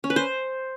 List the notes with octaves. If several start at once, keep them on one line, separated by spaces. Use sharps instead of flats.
C#4
B4
C5